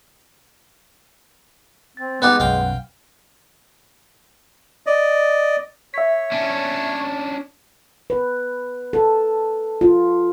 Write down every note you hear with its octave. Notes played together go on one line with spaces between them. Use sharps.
C4 A6
G#3 B3 D#4 G4 B4 F#5
B1 F#2 F5 G5
D5 D#5
C#5 E5 B6
C#4 D4
B4
A4
F4